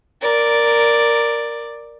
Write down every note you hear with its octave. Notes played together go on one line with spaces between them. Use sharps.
A#4 D5